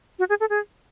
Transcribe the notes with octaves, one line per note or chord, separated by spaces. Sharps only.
F#4
G#4
A4
G#4